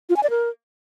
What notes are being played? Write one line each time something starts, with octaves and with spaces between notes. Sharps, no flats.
F4
G#5
D5
A#4